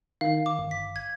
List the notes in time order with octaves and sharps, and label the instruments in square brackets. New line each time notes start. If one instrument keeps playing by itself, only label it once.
[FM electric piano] D#3 [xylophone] F5
[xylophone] D6
[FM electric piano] G1
[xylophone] B6
G#6